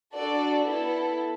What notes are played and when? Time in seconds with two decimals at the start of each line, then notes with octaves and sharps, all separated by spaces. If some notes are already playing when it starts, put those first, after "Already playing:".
0.14 D4 F#4 A4 D5
0.66 B3 E4 A4